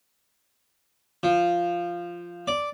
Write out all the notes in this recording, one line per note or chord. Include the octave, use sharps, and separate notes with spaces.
F3
D5